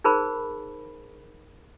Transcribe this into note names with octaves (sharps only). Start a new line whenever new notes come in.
D#4 G#4 A#4 C5 B5